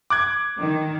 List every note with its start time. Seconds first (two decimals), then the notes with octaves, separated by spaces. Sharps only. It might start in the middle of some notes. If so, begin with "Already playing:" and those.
0.10 D6 F#6 G#6
0.60 D#3